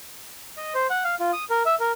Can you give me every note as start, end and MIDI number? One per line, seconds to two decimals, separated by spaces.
0.57 0.73 75
0.75 0.87 72
0.90 1.04 78
1.04 1.15 77
1.20 1.31 65
1.33 1.44 87
1.50 1.63 70
1.66 1.75 76
1.80 1.92 70